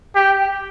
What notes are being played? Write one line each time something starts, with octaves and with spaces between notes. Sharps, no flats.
G4